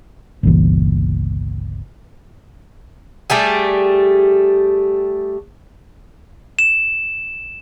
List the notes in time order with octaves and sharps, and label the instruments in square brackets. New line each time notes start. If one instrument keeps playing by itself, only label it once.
[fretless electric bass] G1 C#2 A#2 E3
[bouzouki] G3 A3 G4 G#4
[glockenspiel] E7